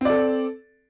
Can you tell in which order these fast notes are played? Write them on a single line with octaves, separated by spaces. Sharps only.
C4 D5 A4